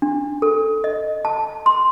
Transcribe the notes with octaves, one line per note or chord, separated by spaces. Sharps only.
D4
A4
D#5
A5
C6